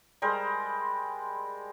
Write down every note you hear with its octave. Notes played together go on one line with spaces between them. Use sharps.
G3 G#3 A#4 C5